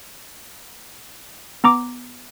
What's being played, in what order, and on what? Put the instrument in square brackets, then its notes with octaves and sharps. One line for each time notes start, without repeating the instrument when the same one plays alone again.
[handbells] B3 A#5 D6